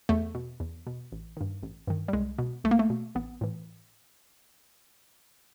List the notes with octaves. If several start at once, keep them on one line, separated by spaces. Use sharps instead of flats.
E2 A3
B2
E2
B2
A1
G2 D#3
A1
G2 D#3
G3
C2 G#3
B2
C2 A3
A#3
A3
B2
A1 B3
A2 E3